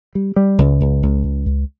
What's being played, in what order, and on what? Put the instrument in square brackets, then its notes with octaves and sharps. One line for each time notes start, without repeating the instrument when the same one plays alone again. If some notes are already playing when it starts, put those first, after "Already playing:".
[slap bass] G3
G3
C#2
C#2
C#2
C#2
C#2